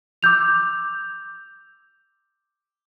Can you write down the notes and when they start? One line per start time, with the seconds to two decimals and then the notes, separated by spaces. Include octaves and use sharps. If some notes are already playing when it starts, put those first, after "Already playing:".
0.23 D6 E6 G6 F7